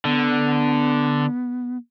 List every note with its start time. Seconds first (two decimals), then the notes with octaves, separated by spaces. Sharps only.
0.05 D3 B3